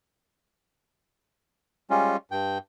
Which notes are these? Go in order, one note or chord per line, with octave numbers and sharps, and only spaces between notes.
G3 G#3 C#4 F4
G2 G5